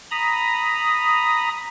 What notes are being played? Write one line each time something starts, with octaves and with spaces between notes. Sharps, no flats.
A#5 B5 D#6